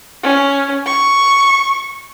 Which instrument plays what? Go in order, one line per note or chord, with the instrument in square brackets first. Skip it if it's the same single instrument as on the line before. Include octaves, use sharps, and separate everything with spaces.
[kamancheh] C#4
C#6